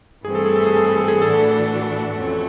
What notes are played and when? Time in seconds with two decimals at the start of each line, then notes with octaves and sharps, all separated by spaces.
0.25 G2 E3 A3 C4 G#4
0.35 A4
0.46 G#4
0.56 A4
0.67 G#4
0.76 A4
0.87 G#4
0.97 A4
1.08 G#4
1.21 A2 E3 A3 D4 F#4 A4
2.18 F2 A3 C#4